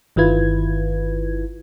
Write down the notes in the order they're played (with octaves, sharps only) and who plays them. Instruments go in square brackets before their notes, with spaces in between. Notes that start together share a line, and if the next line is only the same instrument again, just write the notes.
[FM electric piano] G1 D#3 E4 F4 B4 G#6